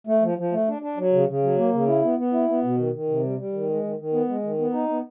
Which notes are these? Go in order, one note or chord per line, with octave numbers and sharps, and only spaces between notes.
A3
F3
F3
A3
D4
D4
F#3
C#3
C#3
F#3
A#3
C#3
E4
B3
B3
E4
B3
B2
D#3
D#3
C3
G3
G3
D#3
G#3
D#3
D#3
B3
G#3
D#3
B3
D#4
B3